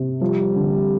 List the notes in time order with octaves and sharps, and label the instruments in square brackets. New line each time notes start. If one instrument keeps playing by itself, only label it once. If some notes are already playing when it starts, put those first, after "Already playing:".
Already playing: [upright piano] C3
[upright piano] F3 [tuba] G3
[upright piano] D3